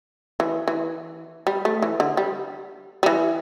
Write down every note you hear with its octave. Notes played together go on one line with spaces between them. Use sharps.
E3
E3
G3
A3
E3
D3
G3
G3
E3